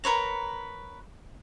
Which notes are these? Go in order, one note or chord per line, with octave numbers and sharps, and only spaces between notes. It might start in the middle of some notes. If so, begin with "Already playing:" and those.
A#4 B4 C#5 A#5